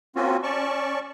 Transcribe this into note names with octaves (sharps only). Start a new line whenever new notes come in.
A#3 C4 C#4 F4 F#4
C#4 D5 A5 C#6